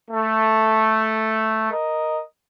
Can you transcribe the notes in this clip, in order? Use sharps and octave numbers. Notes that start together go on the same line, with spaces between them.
A3
A#4 D#5